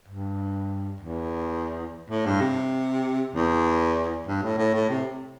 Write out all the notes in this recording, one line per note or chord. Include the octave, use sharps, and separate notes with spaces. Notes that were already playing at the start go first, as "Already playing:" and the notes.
G2
E2
A2
G2
C3
E2
G2
A2
A2
A2
C3